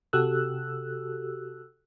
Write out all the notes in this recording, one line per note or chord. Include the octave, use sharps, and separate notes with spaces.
C3 F#4 G4 A4 E6 F#6